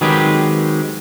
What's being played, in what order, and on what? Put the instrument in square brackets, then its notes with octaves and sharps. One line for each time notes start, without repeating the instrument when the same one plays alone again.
[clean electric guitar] D#3 F#3 G#3 C4 G4 B4